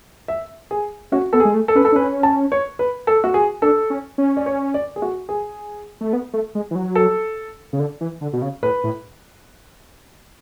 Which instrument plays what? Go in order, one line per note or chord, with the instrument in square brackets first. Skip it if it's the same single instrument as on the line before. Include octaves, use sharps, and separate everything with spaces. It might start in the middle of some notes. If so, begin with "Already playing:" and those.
[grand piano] E5
G#4
[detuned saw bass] C#4 [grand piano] F#4
[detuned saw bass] B3 [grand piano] A4
[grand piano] G#4
[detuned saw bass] G#3
A3
[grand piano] A4
[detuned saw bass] C#4 [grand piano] B4
[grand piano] A4
[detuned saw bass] D4
[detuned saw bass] C#4 [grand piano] B4
[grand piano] A5
C#5
B4
A4
F#4
G#4
[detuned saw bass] D4 [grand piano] A4
[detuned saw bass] C#4
C#4
[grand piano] D5
C#5
D5
G#4
F#4
G#4
[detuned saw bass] A3
B3
A3
G#3
E3
F#3
[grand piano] A4
[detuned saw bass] C#3
D3
E3
D3
B2
C#3
[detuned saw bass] A2 [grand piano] B4
[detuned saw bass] A2